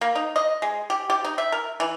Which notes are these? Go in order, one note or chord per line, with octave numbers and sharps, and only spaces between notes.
A#3
D#4
D#5
G#3
G4
G4
D#4
E5
A#4
E3